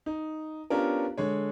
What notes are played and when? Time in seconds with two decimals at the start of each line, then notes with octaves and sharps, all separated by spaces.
0.06 D#4
0.70 B3 C#4 D4 F4 G4 A#4
1.17 D3 G#3 C#5